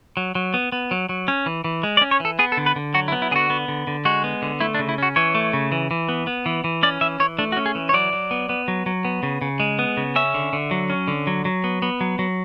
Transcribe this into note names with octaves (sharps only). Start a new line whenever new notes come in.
F#3
F#3
B3
B3
F#3
F#3
C#4
E3
E3
G#3
D5
C#4
C#5
E3 A4
B3 G#4
A4
D3
B4
D3
F#3 F#4
E4
B3
E4
D3 F#4 G#4
B3
D3
D3
G#3 F#4
B3
D3
A3 E4
D4
C#3
E4
C#4 F#4
E3 C#5
A3
C#3
E3
E3
B3
B3
E3
E3
C#4 D5
E3 E5
E3 C#5
A3 D4
F#4
C#4
G#4
E3
C#5
F#3 D5
F#3
B3
B3
F#3
F#3
B3
C#3
C#3
G#3
B3
C#3
C#4 E5
D3
D3
F#3
C#4
D3
F#3
F#3
B3
B3
F#3
F#3